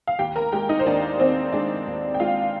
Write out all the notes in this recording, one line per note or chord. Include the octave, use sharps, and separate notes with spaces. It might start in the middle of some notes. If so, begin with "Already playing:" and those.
F5
D#2 G4 G5
A#4 A#5
G#3 G4 G5
D#4 D#5
C5
D#2 D4 D5
D#2 C4 C5
G#3 D4 D5
D#2
G5
G#3 F4 F5